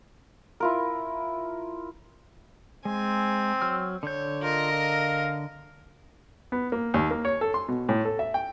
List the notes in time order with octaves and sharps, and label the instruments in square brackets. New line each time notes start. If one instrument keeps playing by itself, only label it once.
[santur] E4 F4 A#4
[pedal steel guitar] G#3 [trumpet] C4 [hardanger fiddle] G#5
[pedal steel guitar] F#3 E6 F6
[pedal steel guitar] D3 G6 [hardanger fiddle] C#5
[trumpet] F4 [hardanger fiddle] A#4 D#5
[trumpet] F5
[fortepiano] B3
A#3
D#2
A#3
C#5
A4
C6
B2
A2
A4
E5
G5